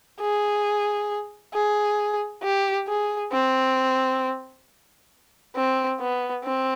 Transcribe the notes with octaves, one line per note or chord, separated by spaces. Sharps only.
G#4
G#4
G4
G#4
C4
C4
B3
C4